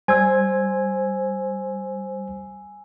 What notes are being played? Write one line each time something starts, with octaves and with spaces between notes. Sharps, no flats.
G3 C5 G#5 E6 G#6